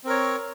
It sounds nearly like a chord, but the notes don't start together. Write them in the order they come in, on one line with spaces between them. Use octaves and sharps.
C4 A#4 C#5